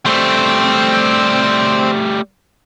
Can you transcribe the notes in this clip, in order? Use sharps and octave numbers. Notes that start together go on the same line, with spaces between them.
G3 A3 C4 C5